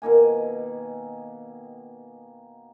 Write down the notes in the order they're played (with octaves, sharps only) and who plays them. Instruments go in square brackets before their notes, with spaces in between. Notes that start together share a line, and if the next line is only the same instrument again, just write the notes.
[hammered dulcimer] B2 D#3 A#3 G#5